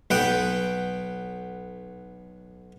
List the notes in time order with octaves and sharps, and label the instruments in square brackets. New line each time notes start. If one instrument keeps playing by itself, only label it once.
[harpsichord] B1 B3 F#5 G5